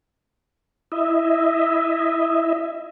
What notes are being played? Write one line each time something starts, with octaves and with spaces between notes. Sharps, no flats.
E4 D#5 E5